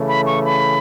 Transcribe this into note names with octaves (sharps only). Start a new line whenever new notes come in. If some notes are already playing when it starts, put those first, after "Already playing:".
Already playing: C#3 E3 A3
B5
C#6
B5